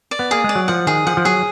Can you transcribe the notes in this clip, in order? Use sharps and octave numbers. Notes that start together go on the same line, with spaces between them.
D5
B3
A#3 G#4
G#3 D5
F#3
F3 F#5
D#3 G#4
F3 F#5
F3
F#3 G#4